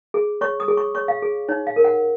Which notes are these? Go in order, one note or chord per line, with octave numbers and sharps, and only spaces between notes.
G#4
C#5 C#6
D#6
G#4
C#6
C#5 C#6
F5
G#4
D#4 C#5
F5
A#4
F#5